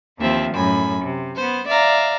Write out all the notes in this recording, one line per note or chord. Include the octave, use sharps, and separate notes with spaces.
D#2 E3 F3 C4 E5
F#2 A2 G#5 B5
C3
B3 C5
D5 E5 F5 A#5